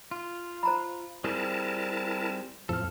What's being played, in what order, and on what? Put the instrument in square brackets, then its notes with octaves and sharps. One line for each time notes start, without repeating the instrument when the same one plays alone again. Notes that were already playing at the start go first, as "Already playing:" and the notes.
[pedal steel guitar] F4
[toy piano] C5 A#5 B5
[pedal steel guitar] G3 C4 G#4 [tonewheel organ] E4 A#4 A5
[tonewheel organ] F2 A2 F3 [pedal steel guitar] A4 F6